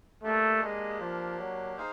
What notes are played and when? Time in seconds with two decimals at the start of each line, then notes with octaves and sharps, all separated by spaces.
0.23 A3 A#3 D4 G4
0.62 G#3
1.00 F3
1.39 F#3
1.77 D#4 G#4 C5 F5